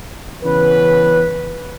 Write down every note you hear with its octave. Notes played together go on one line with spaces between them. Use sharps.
C#3 E3 B3 C#4 B4